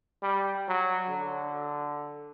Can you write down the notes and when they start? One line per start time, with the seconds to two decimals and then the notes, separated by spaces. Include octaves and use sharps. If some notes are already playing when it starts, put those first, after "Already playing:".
0.22 G3
0.68 F#3
1.09 D3